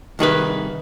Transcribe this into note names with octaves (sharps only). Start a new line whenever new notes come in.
C2 D#3 G#4 B4